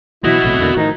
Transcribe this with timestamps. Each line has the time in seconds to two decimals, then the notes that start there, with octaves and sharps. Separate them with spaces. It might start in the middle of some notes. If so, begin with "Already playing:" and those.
0.24 B2 E3 F#3 E4 F#4 D#5
0.43 A#1 A2 C3
0.59 E2 D3 A#3
0.76 A2 D#3 F3 D#4